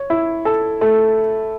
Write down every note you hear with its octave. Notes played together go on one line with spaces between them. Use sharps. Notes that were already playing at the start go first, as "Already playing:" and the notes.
Already playing: C#5
E4
A4
A3